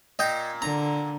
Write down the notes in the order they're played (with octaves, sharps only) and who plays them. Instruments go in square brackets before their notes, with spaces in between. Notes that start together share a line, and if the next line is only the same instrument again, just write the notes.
[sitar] A#2 [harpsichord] D#5 G5
[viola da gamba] D3 [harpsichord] A#5